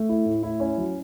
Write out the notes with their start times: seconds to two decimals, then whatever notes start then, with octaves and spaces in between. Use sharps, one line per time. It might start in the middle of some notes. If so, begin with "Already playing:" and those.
Already playing: A3
0.09 E4
0.25 A2
0.43 E4
0.60 C#4
0.78 F#3